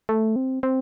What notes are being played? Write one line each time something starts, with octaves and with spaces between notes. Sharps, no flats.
A3
C4
C4